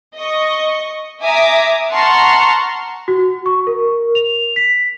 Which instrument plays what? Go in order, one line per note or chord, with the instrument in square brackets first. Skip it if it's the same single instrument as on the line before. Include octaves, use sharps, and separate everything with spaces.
[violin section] D#5 C#6
E5 G#5 A#5 D6 D#6
F#5 A5 A#5 C6 C#6 F6
[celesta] F#4
C#6
A#4
F7
B6